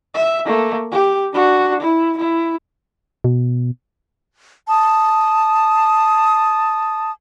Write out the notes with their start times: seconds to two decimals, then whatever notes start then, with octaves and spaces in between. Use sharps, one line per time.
0.15 E5
0.45 A3 A#3
0.92 G4
1.33 D4 F#4
1.81 E4
2.18 E4
3.24 B2
4.68 A5 D#6